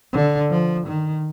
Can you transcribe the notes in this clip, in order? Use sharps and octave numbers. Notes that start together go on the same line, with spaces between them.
D3
F3
D#3